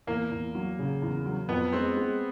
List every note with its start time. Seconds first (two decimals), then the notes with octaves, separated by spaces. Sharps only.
0.07 E2 A#3
0.30 E2
0.55 F#3
0.79 C#3
1.02 E2
1.25 F#3
1.48 F2 B3
1.73 G#3 C4
1.96 G#3